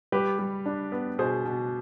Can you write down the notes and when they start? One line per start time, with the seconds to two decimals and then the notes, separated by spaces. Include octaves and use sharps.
0.12 G3 G4 B4
0.39 G3
0.66 D4
0.92 B3
1.19 B2 G#4 C5
1.45 B2